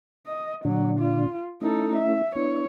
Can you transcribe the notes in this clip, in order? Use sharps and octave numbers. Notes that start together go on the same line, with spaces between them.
D#5
A#2 D3 F#3 D4
F4
A3 C#4 D#4 E4 A4
E5
B3 D4 E4 C#5